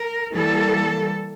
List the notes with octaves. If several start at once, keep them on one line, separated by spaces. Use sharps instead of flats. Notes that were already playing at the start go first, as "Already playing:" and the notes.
Already playing: A#4
E3 G3 A#3 A4